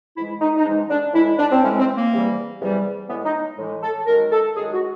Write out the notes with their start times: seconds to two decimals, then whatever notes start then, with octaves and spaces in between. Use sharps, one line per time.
0.16 G#2 E3 G#3 E4
0.41 D#4
0.57 D#4
0.65 G#2 E3 G#3 D4
0.90 D4
1.14 A2 E3 G#3 E4
1.39 D4
1.52 C4
1.63 A2 E3 G#3 C#4
1.79 C4
1.96 A#3
2.12 E2 C3 E3 G3
2.61 E2 C3 E3 G3
3.09 A2 E3 G#3 B3
3.26 D#4
3.58 A2 E3 G#3
3.83 A4
4.07 F#2 D#3 G#3 A#4
4.32 A4
4.56 F#2 D#3 G#3 G#4
4.73 F#4